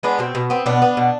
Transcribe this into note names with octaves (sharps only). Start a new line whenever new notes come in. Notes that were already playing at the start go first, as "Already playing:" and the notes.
G#3 B3 D4
B2 C4
B2
B3 C4
B2 B3 D4
B3
B2